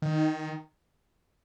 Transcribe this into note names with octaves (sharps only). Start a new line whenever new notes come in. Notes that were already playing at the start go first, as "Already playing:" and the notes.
D#3